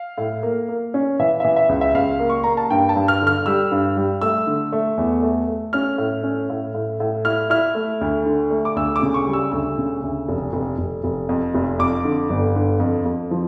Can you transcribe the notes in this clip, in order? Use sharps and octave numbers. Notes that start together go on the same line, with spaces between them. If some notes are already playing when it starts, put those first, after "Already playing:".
Already playing: F5
A2
A#3
A#3
C#4
E3 E5
E3 E5
E5
C#2
E5
C#2 F5
A#3
C#6
A#3 A#5
A5
G2 G5
A5
G2
F6
D3
F6
G3 E6
G2
G3
A3 E6
D3
A3
E2
A3
A3
C#4 F6
A2
C#4
A2
A2
A2
E4 F6
E4 F6
A3
D2
D3
A3
D6
D2 E6
D6
C#3
C#6
G3
E6
D2 E6
C#3
D2
F1
F1
F1
F1
F2
F1
F2 D6
D3
G1
D3
F2
F2
F3